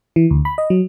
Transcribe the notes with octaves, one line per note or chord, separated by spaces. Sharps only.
E3
D2
B5
D#5
F#3